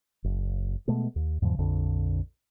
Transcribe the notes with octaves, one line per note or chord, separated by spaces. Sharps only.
F#1
B2 G#3 A3 B3
D#2
E2 G#2 C#3 F3
A#1 F2 D3